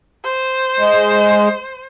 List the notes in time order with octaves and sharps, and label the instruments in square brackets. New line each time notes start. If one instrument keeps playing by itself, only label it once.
[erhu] C5
[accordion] G#3